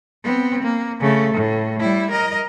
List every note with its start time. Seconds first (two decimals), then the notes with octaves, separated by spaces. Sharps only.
0.24 B3 C4
0.63 A#3
1.00 C#3 A3
1.34 A2
1.80 G3 E4
2.11 A#4 D#5